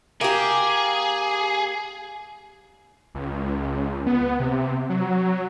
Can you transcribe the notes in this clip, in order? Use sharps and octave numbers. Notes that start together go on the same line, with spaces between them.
A#3 G4 G#4
C#2
B3
C3
F#3